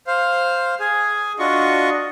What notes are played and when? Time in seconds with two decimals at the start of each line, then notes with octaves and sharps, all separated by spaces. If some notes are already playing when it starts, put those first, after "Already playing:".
0.07 C5 F5
0.80 G#4 G#5
1.39 D4 F4 F#4 D#5 C#6